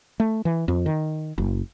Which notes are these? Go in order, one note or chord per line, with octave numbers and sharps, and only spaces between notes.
A3
E3
F2
D#3
F#1